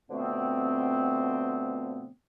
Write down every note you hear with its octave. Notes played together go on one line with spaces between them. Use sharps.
B2 D3 F3 A3 B3 C4